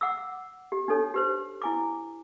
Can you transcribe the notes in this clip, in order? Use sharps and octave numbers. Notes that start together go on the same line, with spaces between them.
F#5 D6 E6
G4
D4 D#4 A4 C#5
G4 B4 C5
E4 G#5 D6